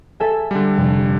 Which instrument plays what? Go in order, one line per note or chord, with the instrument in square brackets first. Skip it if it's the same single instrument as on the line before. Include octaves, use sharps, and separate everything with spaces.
[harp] A4 E5 G#5
[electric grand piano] D3 G3
[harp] F1